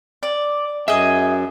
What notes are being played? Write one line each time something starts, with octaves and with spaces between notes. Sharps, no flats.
D5
F#2 G#4 D#5 E5